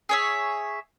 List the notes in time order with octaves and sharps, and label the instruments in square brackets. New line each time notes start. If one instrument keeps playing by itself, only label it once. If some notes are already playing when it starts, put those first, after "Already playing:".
[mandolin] G#4 C#5 E5